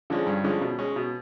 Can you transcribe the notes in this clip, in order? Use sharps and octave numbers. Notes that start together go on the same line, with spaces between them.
D3 F3 G#3 C#4
G2
D3 F3 G#3 C#4
B2
G#3 C#4
B2